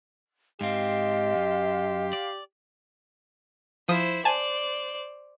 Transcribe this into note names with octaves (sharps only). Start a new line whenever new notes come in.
G#2 C4 G4 D#5 F5 A5 C6
F#2
D5
F3 E4 C5 D#6
C5 D5 G#5 A5